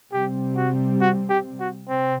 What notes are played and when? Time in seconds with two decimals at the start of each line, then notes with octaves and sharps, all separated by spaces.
0.12 C3 G3 C4 G4
0.57 F#4
1.01 F#4
1.29 G4
1.60 F#4
1.88 C3 C4